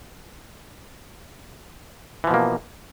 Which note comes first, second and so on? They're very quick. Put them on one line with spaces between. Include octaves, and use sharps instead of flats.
E3 F3 B2 A#3